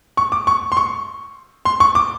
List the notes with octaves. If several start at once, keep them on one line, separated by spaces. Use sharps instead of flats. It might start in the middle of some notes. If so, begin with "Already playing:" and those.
C#6
D6
C#6
C6
C#6
C6
C#6
D6